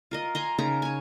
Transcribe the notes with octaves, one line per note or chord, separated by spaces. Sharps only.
F4 A#4 D#5
G#5 A#5 C6
C#3 D#4 A#4 A#5
C#5 G#5